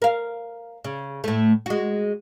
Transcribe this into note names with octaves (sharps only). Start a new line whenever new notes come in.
A#4 F5
C#3
A2 A3
G#3 F#4